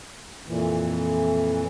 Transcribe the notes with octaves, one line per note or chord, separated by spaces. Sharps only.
F2 A#2 E3